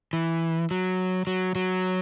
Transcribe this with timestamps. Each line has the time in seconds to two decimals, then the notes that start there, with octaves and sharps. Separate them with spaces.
0.13 E3
0.71 F#3
1.27 F#3
1.55 F#3